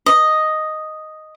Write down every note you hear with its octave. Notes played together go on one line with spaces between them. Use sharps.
D#5